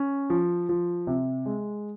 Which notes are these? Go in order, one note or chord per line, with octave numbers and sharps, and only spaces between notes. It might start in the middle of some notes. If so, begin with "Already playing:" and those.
Already playing: C#4
F3
F3
C3
G#3